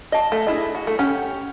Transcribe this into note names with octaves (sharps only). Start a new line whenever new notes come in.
D#5 A5
A3
D4 E4 G#4 D#5
F#4
A3
C#4 G4 F#5